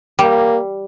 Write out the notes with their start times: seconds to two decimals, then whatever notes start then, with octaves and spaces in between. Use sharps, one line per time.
0.19 G3 A#3